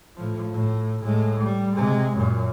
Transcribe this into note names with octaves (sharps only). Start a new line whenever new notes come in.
A2 F3
A2
A2 G#3
G3
C3 G#3
F#2 A#2